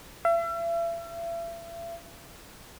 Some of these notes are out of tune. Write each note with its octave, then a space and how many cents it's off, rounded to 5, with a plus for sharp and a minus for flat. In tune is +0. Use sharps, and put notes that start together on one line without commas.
E5 +40